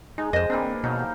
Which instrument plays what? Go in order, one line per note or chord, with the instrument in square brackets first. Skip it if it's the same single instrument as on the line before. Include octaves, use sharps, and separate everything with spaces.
[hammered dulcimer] G#3 [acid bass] D#4
[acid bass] F2 [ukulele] C5 D#5
[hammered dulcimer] E3 A#3 D4 [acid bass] C4
[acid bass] B2 [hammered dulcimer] F3 F#3 D#4
[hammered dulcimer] G4